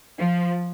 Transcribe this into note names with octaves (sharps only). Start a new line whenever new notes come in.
F3